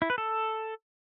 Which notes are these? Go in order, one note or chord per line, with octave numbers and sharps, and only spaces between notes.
E4
B4
A4